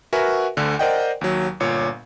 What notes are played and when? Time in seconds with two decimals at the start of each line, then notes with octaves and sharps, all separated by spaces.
0.13 F#4 A#4 B4 E5 F#5 G#5
0.57 D2 D3
0.79 A#4 C5 D5 D#5 F#5 G5
1.21 D#2 F#3
1.60 G1 A#2 C#5